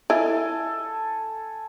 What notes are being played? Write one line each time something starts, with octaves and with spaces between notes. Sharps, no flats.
E4 F4 A4 D#5 G#5